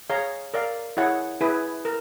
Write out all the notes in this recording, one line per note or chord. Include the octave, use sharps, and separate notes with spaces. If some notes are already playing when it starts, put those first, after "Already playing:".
G#4 C#5 F5 A#5
A#4 D5 F5
E4 G#4 C#5 F#5
E4 G#4 B4
A#4